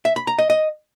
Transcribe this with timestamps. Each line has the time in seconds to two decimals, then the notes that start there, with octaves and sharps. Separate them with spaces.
0.05 E5
0.16 B5
0.27 A#5
0.39 D#5
0.50 D#5